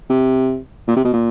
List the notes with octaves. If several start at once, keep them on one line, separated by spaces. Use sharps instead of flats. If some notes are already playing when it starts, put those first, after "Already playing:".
C3
A#2
C3
B2
A#2